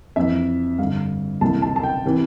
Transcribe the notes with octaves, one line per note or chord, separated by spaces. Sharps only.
F2 E3 E5
G2 D3 F5
C2 C3 E3 A5
A5
A5
G5
C3 E3